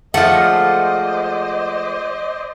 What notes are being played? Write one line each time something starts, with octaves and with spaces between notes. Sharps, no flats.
F3 G#3 A3 C5 D5 D#5 F#5